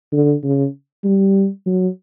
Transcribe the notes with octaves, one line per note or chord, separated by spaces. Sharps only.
D3
C#3
G3
F#3